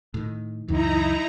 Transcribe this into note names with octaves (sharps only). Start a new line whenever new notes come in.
A2 D#3
C#2 F#2 E3 D#4 E4 A#5